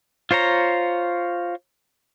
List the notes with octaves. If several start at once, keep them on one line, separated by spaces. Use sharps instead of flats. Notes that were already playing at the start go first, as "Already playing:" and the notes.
F4 C5 C#5 A#5